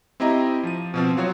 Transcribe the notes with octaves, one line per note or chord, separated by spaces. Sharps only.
C4 E4 G4 D#5 A#5
F3 D#7
B2 F3 C4
F#3 F4 F#4 C#5